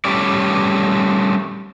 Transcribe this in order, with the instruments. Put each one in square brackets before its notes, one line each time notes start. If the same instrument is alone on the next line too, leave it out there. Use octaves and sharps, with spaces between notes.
[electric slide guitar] G3 A3 C#4 D5